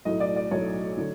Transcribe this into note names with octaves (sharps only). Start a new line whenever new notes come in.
B1 A2 F#3 A3 D#5
D5
D5
B1 A2 F#3 A3 C#5
D3 F#3 A3